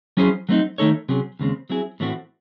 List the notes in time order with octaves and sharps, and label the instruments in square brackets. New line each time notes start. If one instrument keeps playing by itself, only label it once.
[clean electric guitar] F#3 C#4 E4 G#4 C5
F#3 A3 C4 D#4
D#3 A3 D#4 A4 C#5
C3 F#3 C#4 G#4
D#2 C#3 G#3 C4
F#3 C4 E4 G#4
A2 E3 A3 C4 F#4